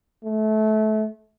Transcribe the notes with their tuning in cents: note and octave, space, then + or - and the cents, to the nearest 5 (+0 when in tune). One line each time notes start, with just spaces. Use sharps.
A3 -25